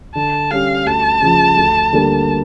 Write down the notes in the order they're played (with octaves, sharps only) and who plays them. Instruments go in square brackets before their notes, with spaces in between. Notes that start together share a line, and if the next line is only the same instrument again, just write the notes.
[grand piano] D3 [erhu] A5
[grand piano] G3 C#4 G4 [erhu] F5
[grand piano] D2 [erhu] A5
[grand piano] C#3 F3
D2
D3 G3 A#3 D4